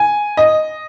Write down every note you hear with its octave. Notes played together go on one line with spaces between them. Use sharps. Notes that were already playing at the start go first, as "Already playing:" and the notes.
Already playing: G#5
D#5